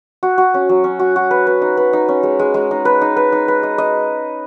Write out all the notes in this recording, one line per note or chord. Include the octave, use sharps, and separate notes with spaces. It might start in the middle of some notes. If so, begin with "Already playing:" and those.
F#4
F#4
C#4
F#3
C#4
F#4
F#4
B4
B4
D#4
B4
D#4
C#4
G#3
G#3
G#3
D#4
B4
D#4
B4
D#4
B4
D#5
D#5